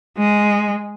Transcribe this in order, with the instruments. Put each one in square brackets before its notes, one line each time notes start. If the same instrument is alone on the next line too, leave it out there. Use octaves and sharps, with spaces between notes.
[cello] G#3